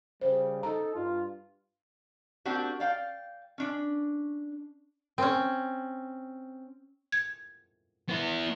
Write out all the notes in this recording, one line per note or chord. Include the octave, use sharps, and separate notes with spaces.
C#3 G3 C5
D#4 A4 A#5
G2 F4
A#3 C4 D4 F#4 G4
D5 F5 G5
C#4 D4
C4 C#4
G#6
B3 E4